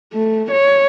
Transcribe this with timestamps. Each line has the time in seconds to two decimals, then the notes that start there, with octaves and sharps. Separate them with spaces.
0.13 A3
0.51 C#5